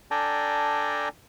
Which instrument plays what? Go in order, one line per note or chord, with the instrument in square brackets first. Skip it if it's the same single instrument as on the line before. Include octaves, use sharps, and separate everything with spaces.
[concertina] D4 A4 D5 G5 G#5 A#5